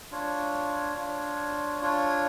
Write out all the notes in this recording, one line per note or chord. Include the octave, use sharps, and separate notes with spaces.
D4 F4 C#5
D4 F4 C#5
D4 F4 C#5